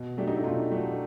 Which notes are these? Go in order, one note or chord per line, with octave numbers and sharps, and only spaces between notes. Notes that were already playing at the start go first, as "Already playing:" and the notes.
Already playing: B2
F#3 A3 D4 G4
D#4
E4
B2 D#4 F4
F#3 A3 D4 G4